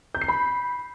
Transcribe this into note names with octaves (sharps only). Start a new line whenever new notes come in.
G6
C7
B5